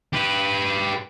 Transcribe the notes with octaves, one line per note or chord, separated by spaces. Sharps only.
G4 B4